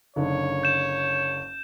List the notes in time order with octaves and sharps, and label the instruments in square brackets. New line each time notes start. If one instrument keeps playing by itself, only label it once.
[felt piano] F#1 D3 D#4 [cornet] C#5
[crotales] G6 E7